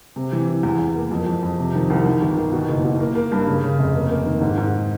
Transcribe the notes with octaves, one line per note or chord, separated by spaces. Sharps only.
C3
E3
E3
E2
E2
A#3
F2
F2
F2
C3
D#3
C2
D#3
G1
D#3
B2
F#1
B2
A#3
A#3
G2
C#3
C#3
F1
A#3
A#3
D#3
G#2
G#2